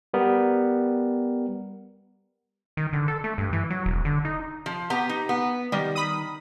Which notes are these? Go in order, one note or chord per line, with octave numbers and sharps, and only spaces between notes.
G3 B3 A#4
D#3
D3
A4
A3
G2
E3
F#3
E1
D3
D#4
F3
B3 G4 A#5
D#4
B3
D#3 G3
B5 D#6